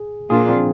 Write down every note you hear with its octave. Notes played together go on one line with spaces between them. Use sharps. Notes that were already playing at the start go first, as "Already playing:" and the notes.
Already playing: G#4
A#2 F3 A#3 D4 F4 G#4
C4